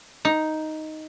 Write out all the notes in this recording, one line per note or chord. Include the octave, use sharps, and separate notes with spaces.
D#4